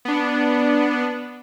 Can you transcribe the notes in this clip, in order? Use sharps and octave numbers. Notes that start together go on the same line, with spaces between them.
B3 D4